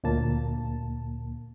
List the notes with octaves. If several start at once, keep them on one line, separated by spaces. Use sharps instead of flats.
D2 A#2 A#3 A5